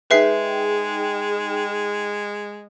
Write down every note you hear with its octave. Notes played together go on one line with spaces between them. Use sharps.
G#3 D#4 G#4 B4 E5 G5 C7